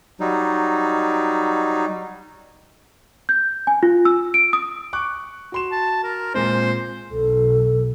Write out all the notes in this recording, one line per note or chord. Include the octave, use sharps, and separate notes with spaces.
F#3 G3 D#4
G6
G#5
F4
E6
D7
D#6
C#6 D6 F#6
F#4 C6 E7
A5
A#4
A#2 G#3 C4 C5
B1 A4